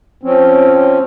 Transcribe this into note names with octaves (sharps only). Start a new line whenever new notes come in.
F3 C4 C#4